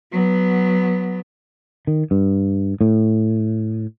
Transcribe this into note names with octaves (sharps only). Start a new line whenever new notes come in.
F#3 B3
D#3
G2
A2